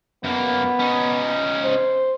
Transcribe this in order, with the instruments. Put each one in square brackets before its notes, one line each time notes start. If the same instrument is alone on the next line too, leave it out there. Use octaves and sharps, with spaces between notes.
[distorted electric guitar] F#2 A#3 [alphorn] B3
[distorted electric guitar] C#4 D#4
[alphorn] C5